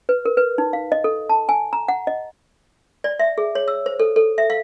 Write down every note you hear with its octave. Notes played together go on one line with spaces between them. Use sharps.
B4
A#4
B4
D#4
F5
D#5
A4
A5
G#5
A#5
F#5
D#5
D5
E5
G#4
C#5
E6
C5
A4
A4
E5
F5